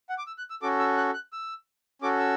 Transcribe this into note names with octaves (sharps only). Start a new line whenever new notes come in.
F#5
D6
E6
F#6
E6
C#4 F#4 A4 D6
E6
F#6
F#6
E6
C#4 F#4 A4 D6
E6